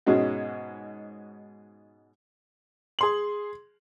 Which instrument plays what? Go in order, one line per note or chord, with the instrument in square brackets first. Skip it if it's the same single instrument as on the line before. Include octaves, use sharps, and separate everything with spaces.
[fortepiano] G#2 B2 G#3 C#4 F#4
[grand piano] G#4 C6 F#7